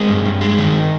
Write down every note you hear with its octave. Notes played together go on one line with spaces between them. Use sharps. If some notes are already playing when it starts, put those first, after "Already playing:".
Already playing: G#3 C4
G2
G2
G#3
D#3